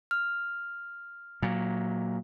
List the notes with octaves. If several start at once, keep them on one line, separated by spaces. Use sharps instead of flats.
F6
A#2 F#3